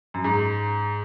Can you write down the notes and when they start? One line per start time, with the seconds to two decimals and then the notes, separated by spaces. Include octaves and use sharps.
0.14 F#2
0.24 G#2